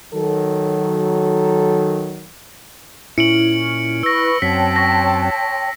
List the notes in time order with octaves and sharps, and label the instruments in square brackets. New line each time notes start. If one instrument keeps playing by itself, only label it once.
[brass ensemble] D#3 F#3 [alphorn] A4
[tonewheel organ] A#2 C#4 [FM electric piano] E4 [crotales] C#7 D7 F#7
[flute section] B4 C#6 [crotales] E6 A#6
[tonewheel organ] F#2 F#3 C4 [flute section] C#5 G5 A5 [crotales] B6
[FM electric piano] C6 C#6 [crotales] A#6